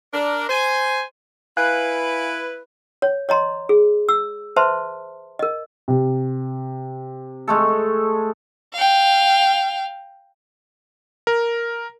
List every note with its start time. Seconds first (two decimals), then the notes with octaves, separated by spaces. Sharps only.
0.13 D4 A#4
0.49 C5 G#5
1.57 E4 B4 F5 G#5 F#6
3.02 C#5
3.29 C#5 D#5 A#5 C6
3.69 G#4
4.09 E6
4.56 B4 C5 E5 A5 C6
5.39 A#4 D#5
5.88 C3
7.48 G#3 A3 A4
8.73 F5 G5
11.27 A#4